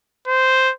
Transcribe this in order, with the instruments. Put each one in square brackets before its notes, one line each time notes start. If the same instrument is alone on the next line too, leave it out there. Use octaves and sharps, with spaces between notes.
[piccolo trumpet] C5